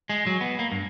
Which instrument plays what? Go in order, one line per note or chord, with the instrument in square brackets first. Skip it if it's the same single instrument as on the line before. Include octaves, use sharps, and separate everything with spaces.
[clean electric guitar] G#3
F#3
B3
A#3
G2